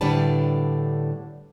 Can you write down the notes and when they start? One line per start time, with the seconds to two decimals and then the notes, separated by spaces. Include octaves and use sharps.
0.01 A2 D3 G3 D4 B4 A5